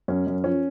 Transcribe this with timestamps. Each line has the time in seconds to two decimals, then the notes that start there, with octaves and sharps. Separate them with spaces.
0.08 F#2 C#4
0.27 F#2
0.44 F3 C#4